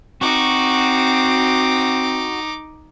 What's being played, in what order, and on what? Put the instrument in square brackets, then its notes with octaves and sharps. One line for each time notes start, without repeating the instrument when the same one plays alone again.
[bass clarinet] C4 [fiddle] D#4 D6 [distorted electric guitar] F#4